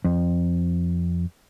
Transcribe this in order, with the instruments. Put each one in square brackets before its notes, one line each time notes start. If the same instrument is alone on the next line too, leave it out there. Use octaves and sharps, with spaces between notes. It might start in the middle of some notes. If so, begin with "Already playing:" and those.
[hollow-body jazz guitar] F2